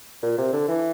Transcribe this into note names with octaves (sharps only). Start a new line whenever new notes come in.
A#2
C3
D3
E3